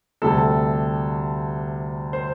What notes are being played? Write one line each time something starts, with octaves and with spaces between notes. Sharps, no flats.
D2 C3 G3 A4
C5